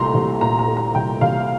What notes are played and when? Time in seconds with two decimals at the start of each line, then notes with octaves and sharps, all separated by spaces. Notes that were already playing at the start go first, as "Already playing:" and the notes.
Already playing: C2 A#2 A3 A#5 C6
0.14 C2
0.41 A#2 A#5
0.59 A#5
0.68 A3
0.77 A#5
0.95 C2 G5
1.21 C2 F5